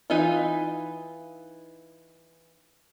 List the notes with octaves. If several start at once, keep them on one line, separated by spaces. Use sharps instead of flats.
E3 D#4 F4